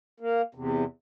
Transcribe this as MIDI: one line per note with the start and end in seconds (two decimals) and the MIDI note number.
0.20 0.42 58
0.55 0.84 40
0.55 0.84 48